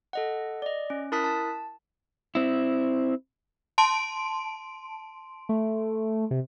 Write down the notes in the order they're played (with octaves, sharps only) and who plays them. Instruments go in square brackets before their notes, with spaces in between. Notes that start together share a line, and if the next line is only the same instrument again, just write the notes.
[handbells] A4 D#5 F#5
D5 D#5
C#4
E4 A#4 A5 D#6 F#6 B6
A5
[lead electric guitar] C4 E4
[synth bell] A5 C6 D7
[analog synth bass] A3
C3